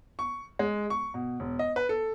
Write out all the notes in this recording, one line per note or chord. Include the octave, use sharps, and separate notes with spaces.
C#6
G#3
C#6
B2
E1
D#5
B4
A4